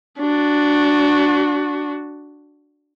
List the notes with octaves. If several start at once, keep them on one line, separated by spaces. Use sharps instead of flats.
D4 F#4